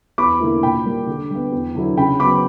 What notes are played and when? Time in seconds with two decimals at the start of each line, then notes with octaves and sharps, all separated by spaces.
0.18 E2 B5 D6
0.40 D3 A#3 E4
0.63 A#2 G5 B5
0.85 G3 A#3
1.07 D3
1.30 G3 B3
1.52 E2
1.75 D3 F#3 B3 E4
1.97 C#3 G5 B5
2.20 F#3 B3 B5 D6